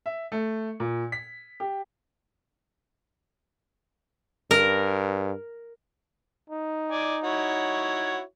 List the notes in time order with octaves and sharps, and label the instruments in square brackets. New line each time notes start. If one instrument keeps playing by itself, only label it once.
[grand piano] E5
A3
A#2
B6
G4
[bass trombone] G2 [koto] A#4
[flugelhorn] D#4
[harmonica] D5 G#5
E4 F#4 C#5